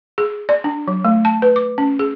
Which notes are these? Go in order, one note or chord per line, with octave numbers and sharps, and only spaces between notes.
G#4
D5
D4
F#3
A3
A5
B4
D6
C#4
G#4